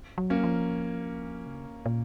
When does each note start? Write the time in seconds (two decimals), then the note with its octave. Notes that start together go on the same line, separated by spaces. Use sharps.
0.18 F#3
0.30 A#3 C#4
0.44 F3
1.46 C#3
1.86 A#2